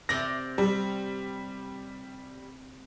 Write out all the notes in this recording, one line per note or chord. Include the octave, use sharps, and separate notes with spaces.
C3 C4 D5 A#6
G3